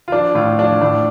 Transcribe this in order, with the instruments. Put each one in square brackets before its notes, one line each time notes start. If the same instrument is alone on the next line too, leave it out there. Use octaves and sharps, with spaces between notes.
[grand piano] F4
F3 D4
A2 F4
F3 D4
A2 D4